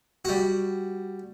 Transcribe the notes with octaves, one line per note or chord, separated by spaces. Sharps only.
G3 F#4